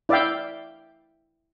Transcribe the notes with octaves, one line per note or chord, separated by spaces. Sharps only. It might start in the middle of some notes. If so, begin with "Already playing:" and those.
E4 D5 E5 F5 G5